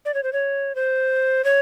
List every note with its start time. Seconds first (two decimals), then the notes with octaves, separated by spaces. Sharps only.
0.05 D5
0.14 C#5
0.23 C5
0.33 C#5
0.75 C5
1.44 C#5